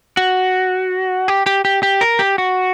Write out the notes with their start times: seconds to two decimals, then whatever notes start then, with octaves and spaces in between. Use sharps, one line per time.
0.17 F#4
1.28 G4
1.46 G4
1.65 G4
1.83 G4
2.01 A#4
2.19 G4
2.38 F#4